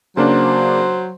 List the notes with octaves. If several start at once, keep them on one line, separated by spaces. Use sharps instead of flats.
C#3 F#3 A#3 D4 C5